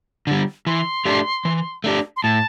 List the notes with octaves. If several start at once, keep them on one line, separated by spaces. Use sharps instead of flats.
D3 G3
E3 C6
A3 D4 G4
E3
A3 D4 G4
C6
A2 A5